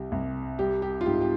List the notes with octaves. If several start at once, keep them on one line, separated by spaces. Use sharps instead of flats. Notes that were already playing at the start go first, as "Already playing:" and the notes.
Already playing: C2 G4
C2
G3 G4
G4
F4
G#2 G4
G4